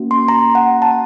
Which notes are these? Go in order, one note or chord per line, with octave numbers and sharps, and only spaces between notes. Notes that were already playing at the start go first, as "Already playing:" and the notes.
Already playing: A#3 C#4 F#4
C6
A#5
F#5
A5